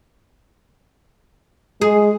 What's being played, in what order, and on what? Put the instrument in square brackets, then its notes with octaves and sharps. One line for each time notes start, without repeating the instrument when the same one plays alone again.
[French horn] G#3 [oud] G#4